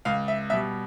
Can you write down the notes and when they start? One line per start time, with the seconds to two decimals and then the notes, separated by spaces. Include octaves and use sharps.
0.05 C#2 F5
0.28 E5
0.50 B2 G3 E5